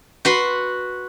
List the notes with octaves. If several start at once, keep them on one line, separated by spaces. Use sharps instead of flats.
F#4 B4 C6